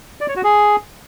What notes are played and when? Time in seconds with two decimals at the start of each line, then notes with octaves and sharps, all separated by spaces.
0.21 D5
0.28 C#5
0.36 F#4
0.44 G#4